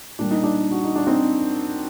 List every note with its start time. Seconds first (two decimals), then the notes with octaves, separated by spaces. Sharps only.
0.19 A#2 G3 D4
0.31 D#4
0.43 D4
0.71 F#4
0.84 D#4
0.96 D4
1.07 C4 D#4